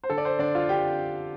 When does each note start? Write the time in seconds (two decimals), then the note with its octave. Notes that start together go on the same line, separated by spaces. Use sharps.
0.04 C5
0.10 D3 A4
0.18 D5
0.25 C5
0.39 D3 D4 D5
0.55 F4 F5
0.69 D4 G4 G5